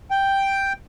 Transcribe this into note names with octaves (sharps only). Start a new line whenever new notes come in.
G5